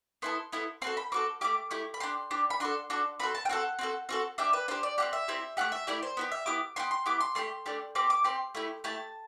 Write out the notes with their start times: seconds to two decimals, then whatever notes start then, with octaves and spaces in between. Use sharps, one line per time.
0.22 B3 E4 A4 C6
0.52 B3 E4 A4
0.82 C4 F#4 A4 C6
0.97 B5
1.12 C4 F#4 A4 D6
1.41 A3 E4 G4 D6
1.71 A3 E4 G4
1.94 B5
2.00 D4 G4 C6
2.31 D4 G4
2.50 B5
2.60 D4 F#4 A4 C6
2.90 D4 F#4 A4
3.20 C4 F#4 A4 B5
3.35 A5
3.45 G5
3.49 C4 F#4 A4 F#5
3.79 C4 F#4 A4
4.09 C4 F#4 A4
4.38 D4 G4 E5
4.53 B4
4.68 D4 G4 C5
4.83 D5
4.98 C4 E4 G4 F#5
5.13 E5
5.28 C4 E4 G4
5.57 A3 E4 G4 F#5
5.72 E5
5.87 A3 E4 G4 D5
6.03 C5
6.17 B3 E4 G4
6.32 E5
6.46 B3 E4 G4 D6
6.76 B3 E4 G4 C6
6.91 C6
7.06 B3 E4 G4 D6
7.20 C6
7.35 A3 D4 G4 C6
7.66 A3 D4 G4
7.95 C4 G4 D6
8.10 D6
8.24 C4 G4 C6
8.55 A3 E4 G4
8.84 A3 E4 G4 A5